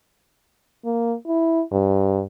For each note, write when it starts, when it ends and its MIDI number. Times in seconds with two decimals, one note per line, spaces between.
0.85 1.15 58
1.27 1.62 64
1.72 2.23 43